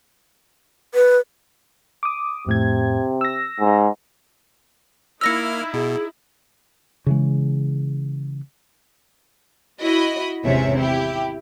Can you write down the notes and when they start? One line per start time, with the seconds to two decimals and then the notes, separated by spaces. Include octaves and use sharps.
0.94 B4
2.03 D6 D#6
2.46 F2 A2 C3 G#6
3.21 E6 A#6
3.59 G#2
5.21 A#3 D#4 E4 E6 F6 A#6 C#7
5.74 B2 G#4
7.06 C#3 E3 G#3
9.81 E4 F#4 D#5 B5
10.45 G#1 E2 C3 C#4 E5
10.77 E4 G4